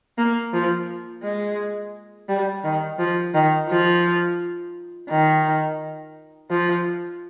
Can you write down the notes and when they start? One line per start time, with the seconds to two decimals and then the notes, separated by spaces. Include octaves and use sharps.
0.18 A#3
0.53 F3
1.23 G#3
2.29 G3
2.64 D#3
2.99 F3
3.34 D#3
3.69 F3
5.10 D#3
6.50 F3